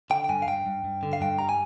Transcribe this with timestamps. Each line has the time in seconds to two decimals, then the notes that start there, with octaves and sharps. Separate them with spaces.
0.10 D3 G5
0.24 G5
0.29 G2 G#5
0.42 F5
0.47 G2 G5
0.66 G2
0.84 G2
1.03 D3
1.13 F5
1.21 G2 G5
1.39 G3 A#5
1.49 G#5